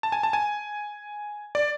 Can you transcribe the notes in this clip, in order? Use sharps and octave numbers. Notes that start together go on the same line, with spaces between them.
A5
G#5
A5
G#5
D5